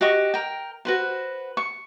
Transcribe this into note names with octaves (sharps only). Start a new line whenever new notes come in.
F#4 G4 D#5 C#6
A#4 G5
F#4 B4 C5
C#6